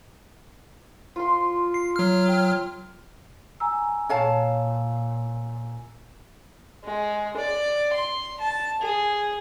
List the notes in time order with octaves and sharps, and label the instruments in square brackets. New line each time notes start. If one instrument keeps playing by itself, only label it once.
[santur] F4 C6
[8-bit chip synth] C7
F#3 F6
[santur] G5
[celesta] G#5 A#5 E6
[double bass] A#2 [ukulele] C#5 F5 A5
[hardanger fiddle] G#3
D5
C6
A5
G#4